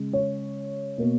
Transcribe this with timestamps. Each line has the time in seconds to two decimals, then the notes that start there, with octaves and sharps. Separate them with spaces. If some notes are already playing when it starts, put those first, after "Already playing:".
Already playing: C#3 G#3
0.13 C#5
0.98 B2 A#3